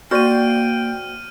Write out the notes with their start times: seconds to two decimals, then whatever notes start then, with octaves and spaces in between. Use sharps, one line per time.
0.11 A#3 F#4 C5 D5 G5 F6 D#7